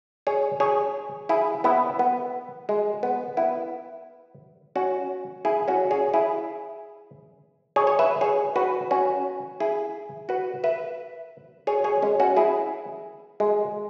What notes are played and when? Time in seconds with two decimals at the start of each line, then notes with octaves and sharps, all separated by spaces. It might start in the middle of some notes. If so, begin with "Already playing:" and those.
0.27 G#4 C#5
0.60 G#4 C#5
1.29 E4 G#4
1.64 B3 E4
1.99 B3
2.69 G#3
3.03 B3
3.37 B3 E4
4.76 C#4 F#4
5.45 E4 G#4
5.68 C#4 F#4
5.91 G#4 C#5
6.14 E4 G#4
7.76 G#4 C#5
7.87 C#5
7.99 B4 E5
8.21 G#4 C#5
8.56 F#4 B4
8.91 C#4 F#4
9.60 E4 G#4
10.29 F#4 B4
10.64 B4 E5
11.67 G#4 C#5
11.84 G#4 C#5
12.02 G#3 C#4
12.20 C#4 F#4
12.37 E4 G#4
13.40 G#3